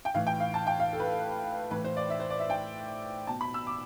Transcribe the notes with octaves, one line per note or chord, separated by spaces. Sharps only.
G5
A2 E3 F5
G5
F5
A5
G5
F5
A4
B4
A4
A2 E3 B4
C5
D5
E5
C5
D5
E5
G5
B2 A5
B5
E6
D6